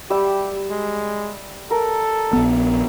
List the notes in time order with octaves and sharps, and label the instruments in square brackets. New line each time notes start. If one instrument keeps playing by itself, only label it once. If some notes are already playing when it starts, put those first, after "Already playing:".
[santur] G3 E5 [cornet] G4
[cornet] G#3
[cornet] A4 [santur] A#4
[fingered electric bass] A#1 B3